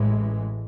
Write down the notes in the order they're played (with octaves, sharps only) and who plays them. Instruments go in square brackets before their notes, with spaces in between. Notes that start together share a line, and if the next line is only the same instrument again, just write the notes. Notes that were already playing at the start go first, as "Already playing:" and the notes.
Already playing: [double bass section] A1 A2 E3 G#3